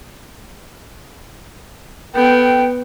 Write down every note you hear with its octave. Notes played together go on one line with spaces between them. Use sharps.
B3 A4 G5